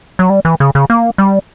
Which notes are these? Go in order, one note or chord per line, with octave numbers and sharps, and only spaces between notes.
F#3
G3
E3
C#3
C#3
A#3
G3